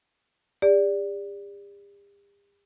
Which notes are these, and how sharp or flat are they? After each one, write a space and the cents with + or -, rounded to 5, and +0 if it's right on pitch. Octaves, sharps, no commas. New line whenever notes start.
G4 +45 D5 -10